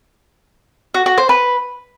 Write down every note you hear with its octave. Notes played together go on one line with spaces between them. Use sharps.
F#4
F#4
C5
B4